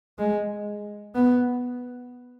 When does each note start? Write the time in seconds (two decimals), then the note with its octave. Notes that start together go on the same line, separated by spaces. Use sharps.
0.18 G#3
1.15 B3